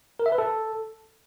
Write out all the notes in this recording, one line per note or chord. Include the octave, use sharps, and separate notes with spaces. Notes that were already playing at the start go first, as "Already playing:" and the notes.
A#4
E5
B4
A4